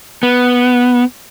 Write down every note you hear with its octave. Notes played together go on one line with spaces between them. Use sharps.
B3